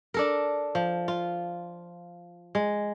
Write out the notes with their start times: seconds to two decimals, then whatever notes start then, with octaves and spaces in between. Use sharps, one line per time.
0.14 D4 A4 A#4
0.75 F3
1.08 F4
2.55 G#3